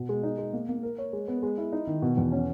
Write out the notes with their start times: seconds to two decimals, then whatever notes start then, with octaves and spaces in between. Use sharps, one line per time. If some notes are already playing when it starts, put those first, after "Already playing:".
Already playing: B2
0.09 G#3
0.23 D#4
0.38 G#3
0.53 A#3
0.69 A#3
0.83 A#4
0.98 C#5
1.13 G#3
1.28 B3
1.43 G#3
1.58 E4
1.73 D#4
1.87 D#3
2.02 B2
2.17 E2
2.32 C#4